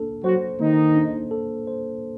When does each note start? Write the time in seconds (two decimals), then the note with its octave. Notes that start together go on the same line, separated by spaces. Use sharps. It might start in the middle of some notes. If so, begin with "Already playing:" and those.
Already playing: A#3 D4 A4
0.24 F#3 F#4 C5
0.60 D#3 A#3 D#4
0.96 D4
1.31 A4
1.67 C5